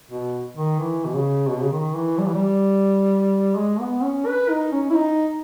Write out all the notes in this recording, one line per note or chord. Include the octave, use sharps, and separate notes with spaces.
B2
D#3
E3
B2
C#3
B2
C#3
D#3
E3
G3
E3
G3
G#3
B3
C#4
B4
D#4
C#4
E4
D#4